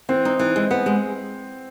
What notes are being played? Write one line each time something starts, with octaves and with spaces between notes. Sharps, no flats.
E3 C4
D#4
E3
G#3
B3
G#3